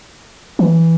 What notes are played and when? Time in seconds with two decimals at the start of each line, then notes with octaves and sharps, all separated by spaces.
0.59 E3